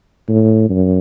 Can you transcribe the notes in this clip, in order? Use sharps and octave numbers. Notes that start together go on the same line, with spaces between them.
A2
F#2